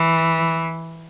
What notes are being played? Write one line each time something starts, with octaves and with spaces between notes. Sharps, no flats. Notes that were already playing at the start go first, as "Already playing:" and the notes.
Already playing: E3